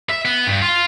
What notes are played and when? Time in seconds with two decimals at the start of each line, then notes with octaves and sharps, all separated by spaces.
0.09 E5
0.25 B3
0.47 G2
0.62 F4